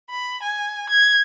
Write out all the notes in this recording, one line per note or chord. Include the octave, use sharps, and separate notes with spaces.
B5
G#5
G#6